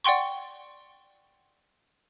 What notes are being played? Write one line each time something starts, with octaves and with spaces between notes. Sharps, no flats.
D5 F#5 G5 C6 C#6